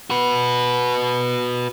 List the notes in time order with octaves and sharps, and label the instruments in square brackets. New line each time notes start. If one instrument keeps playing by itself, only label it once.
[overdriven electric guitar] F#4 B4